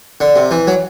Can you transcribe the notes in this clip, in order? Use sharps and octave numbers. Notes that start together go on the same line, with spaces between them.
D3
C3
E3
F#3